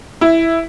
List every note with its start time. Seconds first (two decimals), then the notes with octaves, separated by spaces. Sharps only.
0.21 E4